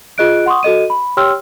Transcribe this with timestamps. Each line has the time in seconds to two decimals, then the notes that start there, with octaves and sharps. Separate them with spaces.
0.18 F4 G#4 D#5 F#6 D7
0.46 F#5 C6 C#6 D#6
0.63 F#4 A4 D#5 D#7
0.90 B5
1.17 G4 C#5 G5 C6 E6 F6